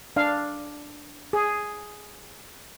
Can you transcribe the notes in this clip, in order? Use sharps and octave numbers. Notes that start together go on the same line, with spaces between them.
D4 F5
G#4